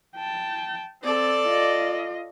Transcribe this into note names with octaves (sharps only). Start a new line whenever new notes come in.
G5 A5
C4 A4 D5
F4 D#5